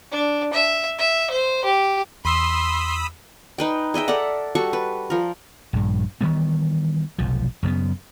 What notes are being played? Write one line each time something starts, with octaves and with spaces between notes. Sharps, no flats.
D4
E5
E5
C5
G4
E2 B5 C6 D#6 E6
D#4 B4 G5
G#4 D#5 E5 G5
A4 A#4 D5 F#5
G3 F#4 A4 C#6
B4
F3 A#4
A#1 G2
D#3 E3 G3 B3
F1 B1 F3
F#2 C#3 A3 B3